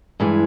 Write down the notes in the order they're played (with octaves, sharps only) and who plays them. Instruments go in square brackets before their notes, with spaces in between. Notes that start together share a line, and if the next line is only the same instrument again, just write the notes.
[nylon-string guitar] G2 E3 G#3